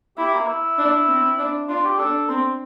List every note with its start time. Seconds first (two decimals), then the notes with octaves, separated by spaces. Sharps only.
0.17 E4 G4
0.33 A#3
0.47 E4
0.78 D4
1.08 C4
1.38 D4
1.69 D4 F4
1.84 G4
1.99 D4 A4
2.29 C4 C5